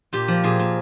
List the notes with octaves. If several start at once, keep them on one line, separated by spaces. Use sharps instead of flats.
A#2 G4
F3
A#2 G#4
A#2